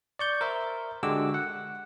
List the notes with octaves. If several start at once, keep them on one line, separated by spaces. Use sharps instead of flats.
D5 C#6 G6
A#4 C5 E5
D3 G#3 F#4 G4 D6 E6
F#5